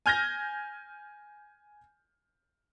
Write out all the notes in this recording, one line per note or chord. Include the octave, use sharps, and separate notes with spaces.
G#5 F6 G6 G#6 A#6